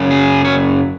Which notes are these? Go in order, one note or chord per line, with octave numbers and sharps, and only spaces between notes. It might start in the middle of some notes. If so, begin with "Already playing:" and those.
Already playing: F#2 C#3
G#4
C#5